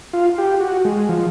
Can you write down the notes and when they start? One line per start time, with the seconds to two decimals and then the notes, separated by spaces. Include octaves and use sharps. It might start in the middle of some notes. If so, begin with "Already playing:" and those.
0.13 F4
0.38 G4
0.60 F#4
0.85 G#3
1.09 F3